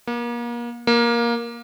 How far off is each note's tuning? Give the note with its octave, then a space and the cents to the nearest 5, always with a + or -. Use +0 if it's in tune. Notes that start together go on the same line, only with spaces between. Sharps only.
A#3 +35
A#3 +15